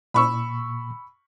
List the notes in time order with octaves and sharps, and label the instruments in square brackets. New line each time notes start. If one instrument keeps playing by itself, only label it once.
[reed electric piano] A#2 [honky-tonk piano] B5 C#6 E6